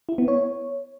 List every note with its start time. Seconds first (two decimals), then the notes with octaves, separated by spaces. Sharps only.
0.09 E4
0.18 B3
0.28 C#5